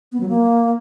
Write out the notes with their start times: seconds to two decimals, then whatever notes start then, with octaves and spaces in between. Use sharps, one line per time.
0.12 B3
0.21 F#3
0.29 A#3